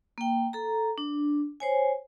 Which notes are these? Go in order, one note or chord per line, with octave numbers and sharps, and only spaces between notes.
A#3 G5
A4 A#5
D4
C5 C#5 G#5